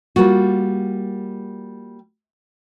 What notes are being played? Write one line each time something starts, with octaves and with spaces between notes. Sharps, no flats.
G3 A#3 F4 F#4